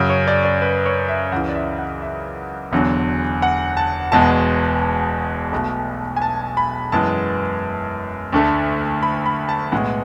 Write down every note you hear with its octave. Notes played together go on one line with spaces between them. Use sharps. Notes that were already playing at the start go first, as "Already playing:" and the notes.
Already playing: F#2 C#3 F#3
C#5
D5
D5
B4
C#5
E5
C#2 C#3 E3 F#5
D5
E5
F#5
E5
E1 E2 D3 F#3
F#5
A5
E1 E2 B2 G#3 B3 A5
B1 B2 A3
G#5
A5
B5
F#2 E3 G#3 B3 A5
D2 D3 A3
B5
B5
A5
B1 A2 G#3 B3 F#5